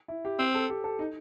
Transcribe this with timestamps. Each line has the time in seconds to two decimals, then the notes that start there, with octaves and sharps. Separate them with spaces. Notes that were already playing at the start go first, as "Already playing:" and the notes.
0.08 E4
0.25 G4
0.39 C4 C5
0.55 A4
0.70 G4
0.84 A4
0.99 D#4